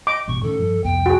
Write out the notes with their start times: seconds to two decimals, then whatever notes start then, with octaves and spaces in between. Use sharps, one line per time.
0.07 D#5 D6
0.28 A1 G2 B2 C#6
0.43 A2 D#3 C#4 A4
0.59 G2 F3
0.84 C2 F2 B3 G5
1.06 F#4 G#4